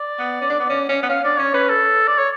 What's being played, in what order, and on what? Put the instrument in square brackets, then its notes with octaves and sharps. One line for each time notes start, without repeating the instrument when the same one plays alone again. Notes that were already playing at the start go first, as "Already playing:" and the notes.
Already playing: [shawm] D5
[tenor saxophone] B3
C#4
D4
B3
C#4
C#4
B3
[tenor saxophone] C#4 [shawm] F5
[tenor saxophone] D4 [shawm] D5
[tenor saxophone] C#4 [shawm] C#5
[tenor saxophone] C#4 [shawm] B4
[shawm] A4
D5
C#5